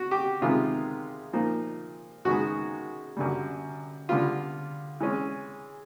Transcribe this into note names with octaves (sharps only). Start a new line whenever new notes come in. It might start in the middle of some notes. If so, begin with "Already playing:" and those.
Already playing: F#4
G4
C3 D#3 G#3 B3 F4
A#2 F3 A#3 D#4
F#2 D#3 G#3 B3 F#4
F#2 D3 G3
D3 G3 B3 F4
E3 G#3 C#4